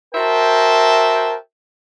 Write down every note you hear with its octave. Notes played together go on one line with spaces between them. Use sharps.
F#4 A#4 C5 E5 G5 A5